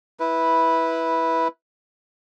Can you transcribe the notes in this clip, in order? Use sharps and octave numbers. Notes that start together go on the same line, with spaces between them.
E4 B4